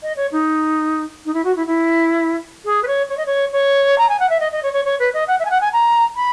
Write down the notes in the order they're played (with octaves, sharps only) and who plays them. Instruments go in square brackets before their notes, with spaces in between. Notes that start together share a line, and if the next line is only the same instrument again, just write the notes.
[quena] D#5
C#5
D#4
D#4
E4
F#4
E4
E4
G#4
B4
C#5
C#5
D#5
C#5
C#5
A#5
G#5
F#5
E5
D#5
D#5
C#5
C#5
C#5
B4
D#5
F#5
E5
G#5
F#5
G#5
A#5
B5